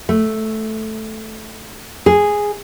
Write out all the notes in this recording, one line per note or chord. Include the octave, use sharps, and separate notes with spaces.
A3
G#4